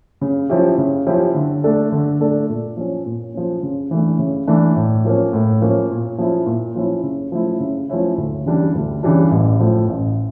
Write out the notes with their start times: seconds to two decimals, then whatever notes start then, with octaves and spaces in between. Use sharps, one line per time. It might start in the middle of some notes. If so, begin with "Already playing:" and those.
0.21 C#3
0.49 F3 C#4 E4 G4
0.78 C#3
1.06 F3 C#4 E4 G4
1.35 D3
1.64 A3 D4 A4 D5
1.92 D3
2.20 A3 D4 A4 D5
2.49 A#2
2.77 F3 C#4
3.06 A#2
3.34 F3 C#4
3.63 C#3
3.91 E3 A3 D4
4.19 C#3
4.47 E3 A3 D4
4.76 A2
5.05 F3 A#3 C#4
5.33 A2
5.62 F3 A#3 C#4
5.91 A#2
6.18 F3 C#4 E4
6.46 A#2
6.76 F3 C#4 E4
7.03 C#3
7.32 F3 A3 C#4 E4
7.60 C#3
7.89 F3 A3 C#4 E4
8.18 D2
8.46 C#3 E3 G3 D4
8.75 D2
9.03 C#3 E3 G3 D4
9.31 A1
9.59 A2 F3
9.88 A1